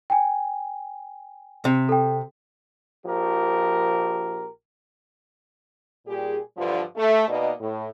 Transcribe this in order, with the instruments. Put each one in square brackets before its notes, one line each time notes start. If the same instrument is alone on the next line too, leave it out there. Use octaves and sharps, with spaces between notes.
[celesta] G5 G#5
[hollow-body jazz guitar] C3
[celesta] A4 G5
[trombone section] A#1 F3 G4 A#4
[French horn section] A#2 G3 G4 G#4
G2 D3 E3 F3
A3
B2 A#3 B3 D#4 D5 D#5
A2